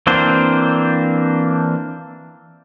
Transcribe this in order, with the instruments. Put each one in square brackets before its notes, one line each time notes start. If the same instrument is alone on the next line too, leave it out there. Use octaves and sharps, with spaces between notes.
[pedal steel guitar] E3 A#3 C4 D4 C5